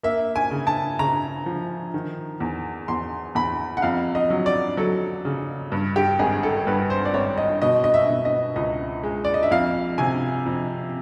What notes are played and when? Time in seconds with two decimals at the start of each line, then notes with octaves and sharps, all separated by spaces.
0.03 A#3 E5
0.36 G#5
0.51 C#3
0.67 A5
0.99 C#3 A#5
1.46 F3
1.94 D#3
2.40 E2
2.88 E2 C6
3.35 E2 B5
3.77 F#5
3.82 F2 F5
4.15 D#5
4.30 F#3
4.46 D5
4.77 F#3 A4
5.25 C#3
5.72 G2
5.96 G4
6.19 G#1 G#4
6.43 A4
6.67 G2 B4
6.90 C5
7.05 D5
7.14 G#1 C#5
7.38 D#5
7.62 B2 D#5
7.84 D#5
7.94 E5
8.09 B2
8.25 D#5
8.56 C#2 D#5
9.03 G#3
9.25 D5
9.34 D#5
9.43 E5
9.51 F2 F5
9.98 C3 G#5
10.46 F2